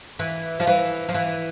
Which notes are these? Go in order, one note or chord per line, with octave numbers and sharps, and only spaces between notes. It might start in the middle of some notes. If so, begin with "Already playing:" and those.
E3
F3
E3
F3
E3